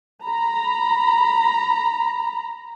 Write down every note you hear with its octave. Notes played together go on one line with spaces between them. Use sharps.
A#5 B5